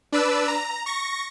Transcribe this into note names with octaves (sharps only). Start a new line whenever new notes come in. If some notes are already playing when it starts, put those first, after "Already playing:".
D4 B4 D5 E6
A#5
C#6 A#6